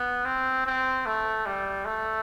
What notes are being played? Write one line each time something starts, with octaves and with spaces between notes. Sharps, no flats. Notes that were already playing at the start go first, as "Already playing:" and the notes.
Already playing: B3
C4
C4
A3
G3
A3